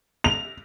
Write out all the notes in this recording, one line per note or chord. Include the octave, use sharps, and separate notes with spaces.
F7